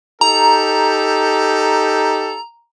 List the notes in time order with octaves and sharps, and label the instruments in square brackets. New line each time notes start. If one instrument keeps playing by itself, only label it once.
[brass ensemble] D#4 G4 A4 [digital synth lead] A#5